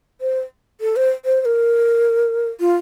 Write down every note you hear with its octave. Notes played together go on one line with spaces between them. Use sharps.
C5
A4
C5
C5
C5
A#4
F4